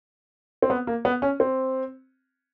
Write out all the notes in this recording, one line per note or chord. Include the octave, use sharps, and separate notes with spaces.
C4
B3
A#3
B3
C#4
C4